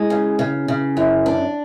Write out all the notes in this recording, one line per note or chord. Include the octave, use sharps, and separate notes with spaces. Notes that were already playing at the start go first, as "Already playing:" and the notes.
Already playing: G#3 E4
C#3
C#3
C#3
F#2 E4
D4